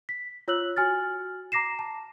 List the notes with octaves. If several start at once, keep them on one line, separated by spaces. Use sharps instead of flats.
B6
F4 C#5 E6 F#6 F#7
F#4 G#5 F6 A6
A#5 D6 A#6 C7 E7
A5